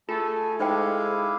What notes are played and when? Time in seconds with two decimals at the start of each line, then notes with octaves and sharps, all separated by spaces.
0.09 A3 F4 G#4 A4
0.60 G#3 D#4 E4 G4 C5 F5 G5